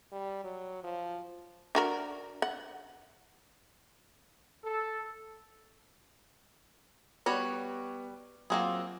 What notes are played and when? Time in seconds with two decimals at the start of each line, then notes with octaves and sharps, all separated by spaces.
0.12 G3
0.44 F#3
0.84 F3
1.75 D4 F#4 A#4
2.42 F#5
4.64 A4
7.26 G3 B3 F#4 C#5
8.50 F#3 A#3 C4 F4 G#4 F#5